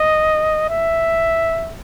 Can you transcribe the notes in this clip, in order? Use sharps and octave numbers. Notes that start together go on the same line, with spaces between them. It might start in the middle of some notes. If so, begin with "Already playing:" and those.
Already playing: D#5
E5